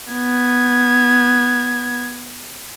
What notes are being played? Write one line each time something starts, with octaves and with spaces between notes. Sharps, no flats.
B3 G#6